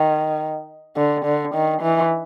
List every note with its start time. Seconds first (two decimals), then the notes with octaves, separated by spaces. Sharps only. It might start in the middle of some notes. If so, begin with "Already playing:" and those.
Already playing: D#3
0.97 D3
1.25 D3
1.54 D#3
1.82 E3